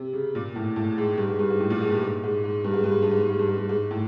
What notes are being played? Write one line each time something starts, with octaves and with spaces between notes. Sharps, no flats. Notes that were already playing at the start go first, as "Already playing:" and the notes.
Already playing: C3
C#3
A#2
A2
A2
G#2
G2
G#2
G2
G#2
A2
A#2
G#2
G2
G#2
G#2
G#2
G2
G#2
G2
G#2
G2
G#2
G2
G#2
G2
G#2
G2
G#2
A2